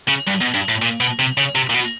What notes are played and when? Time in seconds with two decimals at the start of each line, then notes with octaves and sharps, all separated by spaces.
0.08 C#3
0.27 G2
0.41 B2
0.54 G2
0.69 A2
0.82 A#2
1.00 B2
1.19 C3
1.37 C#3
1.55 C3
1.70 A#2
1.74 B2